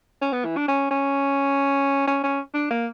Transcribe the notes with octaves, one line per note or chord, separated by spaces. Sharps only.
C#4
B3
E3
D4
C#4
C#4
C#4
C#4
D4
A#3